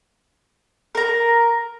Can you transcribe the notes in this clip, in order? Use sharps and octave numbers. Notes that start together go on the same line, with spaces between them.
A#4 A#5